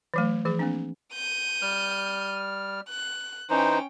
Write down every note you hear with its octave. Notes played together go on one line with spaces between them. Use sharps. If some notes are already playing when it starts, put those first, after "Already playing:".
E3 F#3 A3
E3 F3 G#4
A#3 C4 D4
G6 D#7
G3 F6
F#6
E3 C#4 D#4 C5 G5